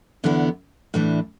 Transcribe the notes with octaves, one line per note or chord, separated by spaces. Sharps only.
E2 D3 B3 E4
A2 E3 D4